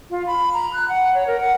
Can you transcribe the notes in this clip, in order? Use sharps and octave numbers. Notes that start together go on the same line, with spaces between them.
F4
B5
A#5
F#6
F#5
C#5
A#4
F#5